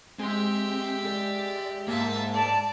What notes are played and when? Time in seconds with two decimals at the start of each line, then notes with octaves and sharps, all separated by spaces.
0.19 G#3 C4 G4 E5
1.06 D5
1.88 G#2 A#3 E5 A5
2.34 D5 A5